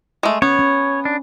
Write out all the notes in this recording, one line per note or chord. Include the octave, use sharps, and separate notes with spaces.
G#3 A3
B3 C#4 C#5
C#4
D4